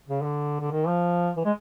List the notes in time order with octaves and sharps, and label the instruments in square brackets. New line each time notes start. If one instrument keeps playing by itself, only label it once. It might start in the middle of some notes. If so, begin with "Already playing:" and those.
[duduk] C#3
D3
D3
D#3
F3
E3
G#3